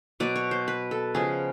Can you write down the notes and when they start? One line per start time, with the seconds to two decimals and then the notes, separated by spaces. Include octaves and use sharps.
0.20 B2 F#3 B3 D5
0.36 C#5
0.51 C5
0.68 B4
0.91 A4
1.14 C#3 F3 G#3 B3 G#4